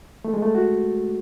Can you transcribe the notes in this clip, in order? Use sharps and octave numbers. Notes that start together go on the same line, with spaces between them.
A3
G#3
A3
F#4